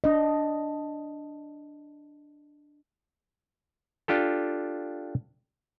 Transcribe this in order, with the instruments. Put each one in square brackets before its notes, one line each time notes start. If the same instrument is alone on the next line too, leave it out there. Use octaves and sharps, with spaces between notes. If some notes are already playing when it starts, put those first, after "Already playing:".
[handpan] D4 D#5
[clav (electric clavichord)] D4 F4 G4 A4